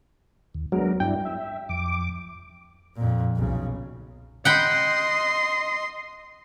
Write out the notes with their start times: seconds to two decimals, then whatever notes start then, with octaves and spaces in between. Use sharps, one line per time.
0.54 D#2
0.72 F#3 G#3 B3 D4 A#4
1.00 G2 D4 E4 G5
1.25 E5
1.69 F2 D6
2.96 F2 A#2
3.36 B1 C#3
4.45 D#5 F#5 G5 B5 C6